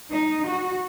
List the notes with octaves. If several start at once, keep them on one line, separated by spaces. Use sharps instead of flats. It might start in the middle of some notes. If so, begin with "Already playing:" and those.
D#4
F#4